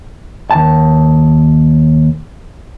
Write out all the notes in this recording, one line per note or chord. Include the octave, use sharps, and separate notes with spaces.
D#2 A5